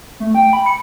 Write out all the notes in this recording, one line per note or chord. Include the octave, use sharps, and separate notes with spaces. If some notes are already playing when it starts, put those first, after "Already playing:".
A3
G5
B5
C#7